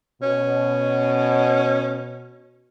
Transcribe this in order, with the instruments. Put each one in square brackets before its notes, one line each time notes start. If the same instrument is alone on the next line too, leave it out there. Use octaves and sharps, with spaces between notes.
[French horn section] B2 [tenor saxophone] C#4